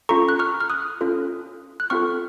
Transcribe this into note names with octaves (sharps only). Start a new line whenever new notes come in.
C#4 F4 A4 A#5 C#6
F#6
C#6 F6
F6
D#6 F#6
C#4 F4 A4
F#6
C4 F4 A4 C#6 F6